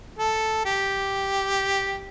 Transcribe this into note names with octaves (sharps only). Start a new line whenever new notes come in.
A4
G4